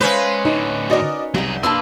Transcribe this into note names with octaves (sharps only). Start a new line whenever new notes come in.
G#3 C#4 B4 C5 E5 F5
A2 D3 D#4
D#4 F#4 A#4 D5 D#5
C2 F#3 G#4 G5 A#5
A#3 D4 B4 D5 A5 C6 E6